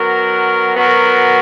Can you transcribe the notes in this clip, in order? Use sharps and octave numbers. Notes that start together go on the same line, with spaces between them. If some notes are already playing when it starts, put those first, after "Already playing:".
Already playing: F#3 B3 F#4 A#4
F#3 B3 F#4 A#4